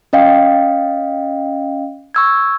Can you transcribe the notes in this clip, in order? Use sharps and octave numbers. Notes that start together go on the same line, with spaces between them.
C#4 D#5 F5 G5
C#6 E6 G#6